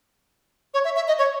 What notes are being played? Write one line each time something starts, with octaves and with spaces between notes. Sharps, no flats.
C#5
E5
E5
D#5
C#5